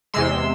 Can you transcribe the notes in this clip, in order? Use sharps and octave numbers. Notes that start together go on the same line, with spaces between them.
E2 C3 G#3 C6 E6